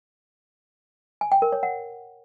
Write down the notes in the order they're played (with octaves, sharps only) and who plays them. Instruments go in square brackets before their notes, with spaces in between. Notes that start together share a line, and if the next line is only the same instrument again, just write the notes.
[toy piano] G#5
G5
A#4
C#5
F#5